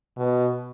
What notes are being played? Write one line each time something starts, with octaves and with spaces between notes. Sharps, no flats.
B2